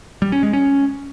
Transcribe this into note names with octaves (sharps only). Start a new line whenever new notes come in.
G3
C#4
G#3
C#4